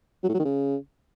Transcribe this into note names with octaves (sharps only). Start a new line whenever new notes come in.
F#3
A2
F#3
D#3
C#3